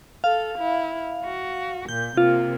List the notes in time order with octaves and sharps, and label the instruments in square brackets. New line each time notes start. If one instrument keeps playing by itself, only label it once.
[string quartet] A4 [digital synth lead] F5
[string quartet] E4
F#4
[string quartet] A#2 [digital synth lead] G6
[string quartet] C3 A#3 [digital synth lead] F4